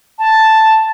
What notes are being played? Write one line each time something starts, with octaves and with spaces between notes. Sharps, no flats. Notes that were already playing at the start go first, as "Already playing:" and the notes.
A5